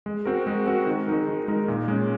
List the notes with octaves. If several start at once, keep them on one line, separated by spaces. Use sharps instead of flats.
G#3
C4 F#4 A#4
G#3
C4 F#4 A#4
D#3
G#3 D#4 A#4
D#3
G#3 D#4 A#4
A#2
G#3 C#4